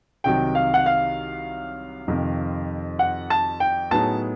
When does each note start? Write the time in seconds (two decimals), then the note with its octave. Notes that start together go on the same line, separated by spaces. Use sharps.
0.24 C2 C3 D#3 F#3 G5
0.55 F5
0.74 F#5
0.86 F5
2.08 F2 C3 D#3
2.99 F#5
3.30 A5
3.60 G5
3.91 A2 F#3 B3 D#4 G#4 A5